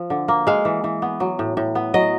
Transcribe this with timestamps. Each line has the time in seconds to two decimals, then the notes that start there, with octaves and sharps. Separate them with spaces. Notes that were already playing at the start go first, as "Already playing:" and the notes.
Already playing: F3
0.10 D3
0.28 A#3
0.47 G#3 F5
0.65 E3
0.84 E3
1.02 B3
1.20 F#3
1.39 A2
1.57 A2
1.75 B3
1.94 F#3 D#5